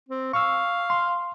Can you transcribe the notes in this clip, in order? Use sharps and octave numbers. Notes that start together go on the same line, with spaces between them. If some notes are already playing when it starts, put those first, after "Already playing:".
C4
F5 C#6 E6
C6